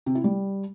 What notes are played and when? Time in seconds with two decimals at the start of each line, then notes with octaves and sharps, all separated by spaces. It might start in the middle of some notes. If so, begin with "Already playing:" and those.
0.06 C3
0.15 E4
0.24 G3